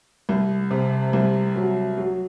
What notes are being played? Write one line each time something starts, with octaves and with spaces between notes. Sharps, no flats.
C2
C3
C2
F#3
F#3